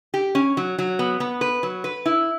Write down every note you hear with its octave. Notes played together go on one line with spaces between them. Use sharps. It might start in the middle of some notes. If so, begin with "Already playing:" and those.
G4
C#4
F#3
F#3
B3
B3
B4
F#3
B4
E4